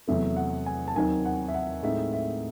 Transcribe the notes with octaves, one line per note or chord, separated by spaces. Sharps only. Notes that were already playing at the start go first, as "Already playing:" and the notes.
E2 C3 F#3 A3 E5
F#5
G#5
A5
D#2 D#3 F#3 C4 D#4 G#5
F#5
E5
F#5
A2 G#3 C4 D#4 E5
E5